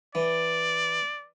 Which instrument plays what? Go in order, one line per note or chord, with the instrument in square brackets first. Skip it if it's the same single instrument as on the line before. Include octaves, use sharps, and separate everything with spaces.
[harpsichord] E3 [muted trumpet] D5